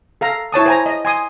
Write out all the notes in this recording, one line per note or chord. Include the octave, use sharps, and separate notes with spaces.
A4 F5 A#5
E4 C#5 A5 D#6
C5 G#5 A#5
D#5
G#5 C6 D#6